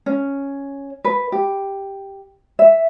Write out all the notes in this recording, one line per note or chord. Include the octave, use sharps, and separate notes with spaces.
C#4
B4
G4
E5